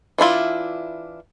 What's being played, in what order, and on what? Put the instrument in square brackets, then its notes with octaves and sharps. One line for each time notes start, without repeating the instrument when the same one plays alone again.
[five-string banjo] E3 D4 E4 F4